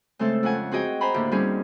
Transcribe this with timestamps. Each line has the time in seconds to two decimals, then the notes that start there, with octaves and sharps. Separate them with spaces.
0.19 C#3 G#3 A3 C4 A4 C5
0.43 F2 C#4 F#5 G#5
0.72 C4 F#4 G#4 D#5 G5 G#5
1.01 C5 G#5 A#5 B5
1.14 D#2 A2 D3 G4
1.31 G3 C4 C#4 D#4 G#4